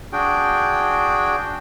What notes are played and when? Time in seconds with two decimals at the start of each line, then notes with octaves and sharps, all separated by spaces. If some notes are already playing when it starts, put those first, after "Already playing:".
0.13 D4 F#4 G#4 G5